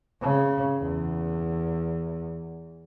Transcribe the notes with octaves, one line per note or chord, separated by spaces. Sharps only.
C#3
E2